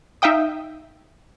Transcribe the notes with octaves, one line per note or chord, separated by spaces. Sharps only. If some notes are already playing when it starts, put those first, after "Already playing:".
D#4 E5 F5 G5 D#6